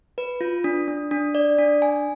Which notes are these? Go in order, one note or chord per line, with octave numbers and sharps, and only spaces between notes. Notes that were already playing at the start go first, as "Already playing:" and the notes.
B4
F4
D4
D4
D4
D5
D4
G#5